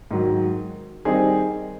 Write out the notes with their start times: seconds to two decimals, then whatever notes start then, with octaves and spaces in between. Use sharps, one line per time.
0.11 G#2 D#3 F#3
1.05 D#3 G3 C4 D#4 G#4